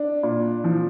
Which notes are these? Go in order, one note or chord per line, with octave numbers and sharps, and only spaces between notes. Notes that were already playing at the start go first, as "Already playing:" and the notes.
Already playing: D4
A#2
F3